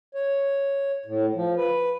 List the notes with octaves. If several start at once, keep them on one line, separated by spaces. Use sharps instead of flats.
C#5
A2
F3
B4